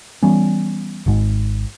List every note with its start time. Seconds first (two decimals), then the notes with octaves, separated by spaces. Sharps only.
0.23 E3 G3 B3 C#4
1.06 G#1 G#2 G#3